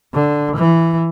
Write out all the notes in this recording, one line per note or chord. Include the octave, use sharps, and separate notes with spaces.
D3
E3